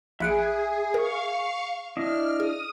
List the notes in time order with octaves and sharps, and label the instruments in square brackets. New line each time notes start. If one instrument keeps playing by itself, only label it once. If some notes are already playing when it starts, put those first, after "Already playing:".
[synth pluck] A#1 C#7 D7 [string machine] G#4 [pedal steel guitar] E5 B5 F#6
[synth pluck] A#4 [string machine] F5 C#6
[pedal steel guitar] D4 E4 D#5 [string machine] F6
[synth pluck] G#4 [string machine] D#6